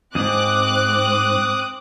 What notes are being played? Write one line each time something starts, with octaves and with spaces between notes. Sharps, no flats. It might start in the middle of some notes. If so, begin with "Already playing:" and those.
F2 G#2 C4 D6 D#6 F#6